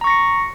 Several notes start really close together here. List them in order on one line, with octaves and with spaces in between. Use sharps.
A#5 C#6 A#6 C#7